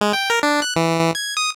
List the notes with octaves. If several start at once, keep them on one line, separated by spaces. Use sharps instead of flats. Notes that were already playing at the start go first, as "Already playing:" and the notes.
G#3
G5
A#4
D4
F#6
E3
E3
G#6
D#6